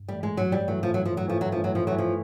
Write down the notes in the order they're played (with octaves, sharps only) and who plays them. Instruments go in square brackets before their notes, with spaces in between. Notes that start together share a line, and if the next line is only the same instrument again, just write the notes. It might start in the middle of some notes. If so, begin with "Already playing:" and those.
Already playing: [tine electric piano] G2
[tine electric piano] E3 A3 [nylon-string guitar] G3
[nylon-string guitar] G#3
[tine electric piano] G2 [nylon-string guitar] F#3
[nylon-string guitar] G3
[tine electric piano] E3 A3 [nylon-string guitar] F#3
[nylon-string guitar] F3
[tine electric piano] G2 [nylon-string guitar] F#3
[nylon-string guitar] F3
F#3
[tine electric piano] E3 A3 [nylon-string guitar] F3
[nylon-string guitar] F#3
[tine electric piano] G2 [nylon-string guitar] F3
[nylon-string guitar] F#3
F3
[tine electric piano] E3 A3 [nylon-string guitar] F#3
[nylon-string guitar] F3